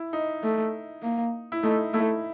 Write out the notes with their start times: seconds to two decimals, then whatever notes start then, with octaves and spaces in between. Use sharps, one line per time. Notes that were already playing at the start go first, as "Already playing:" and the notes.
Already playing: E4
0.13 D#4
0.43 A3
1.03 A#3
1.52 E4
1.63 A3 D#4
1.93 A3 E4